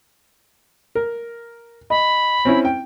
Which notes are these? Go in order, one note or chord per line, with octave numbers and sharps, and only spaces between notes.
A#4
D#5 B5
C4 C#4 E4
G5